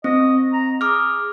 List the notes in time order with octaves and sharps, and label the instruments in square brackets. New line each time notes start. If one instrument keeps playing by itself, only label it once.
[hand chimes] C4 [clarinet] D#5
[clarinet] A#5
[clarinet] G#4 [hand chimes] D6 F6